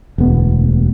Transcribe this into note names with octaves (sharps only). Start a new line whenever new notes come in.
E1 D2 B3